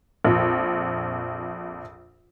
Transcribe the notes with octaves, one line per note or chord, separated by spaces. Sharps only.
A#1 F2